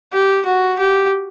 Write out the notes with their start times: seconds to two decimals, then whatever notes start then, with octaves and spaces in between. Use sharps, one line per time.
0.13 G4
0.46 F#4
0.79 G4